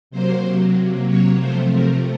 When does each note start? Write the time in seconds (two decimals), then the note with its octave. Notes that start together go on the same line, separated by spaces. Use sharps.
0.11 C3 F#3 A#3 C5
1.07 C#5
1.38 C3 F3 A3 C5
1.71 A#4